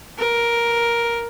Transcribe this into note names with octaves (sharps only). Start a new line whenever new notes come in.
A#4